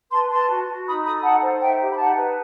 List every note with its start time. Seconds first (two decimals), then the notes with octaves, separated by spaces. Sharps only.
0.11 B4 A5 C6
0.30 B4 A5 C6
0.48 F#4
0.67 F#4
0.86 D#4 B5 D#6
1.04 A4 B5 D#6
1.22 D#4 F#5 A5
1.42 C5
1.60 D#4 E5 G5
1.79 G4
1.91 B5
1.97 D#4 F#5 A5
2.15 B4